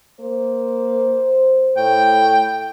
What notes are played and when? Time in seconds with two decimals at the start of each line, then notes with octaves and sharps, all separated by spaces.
0.20 A#3 C5
1.77 A2 G5